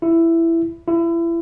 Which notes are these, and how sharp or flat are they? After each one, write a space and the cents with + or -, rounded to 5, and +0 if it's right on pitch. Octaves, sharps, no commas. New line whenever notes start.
E4 +10
E4 +30